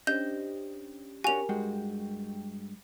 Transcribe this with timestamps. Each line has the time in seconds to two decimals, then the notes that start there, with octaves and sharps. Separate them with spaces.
0.07 C#4 D4 G4 C5 D#5 G6
1.24 C#4 D4 F#4 G4 A#4 G#5 F7
1.49 G2 G#3 F#4 G5